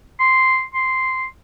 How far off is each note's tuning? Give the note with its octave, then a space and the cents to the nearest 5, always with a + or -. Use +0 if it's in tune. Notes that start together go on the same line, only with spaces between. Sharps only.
C6 -5
C6 -5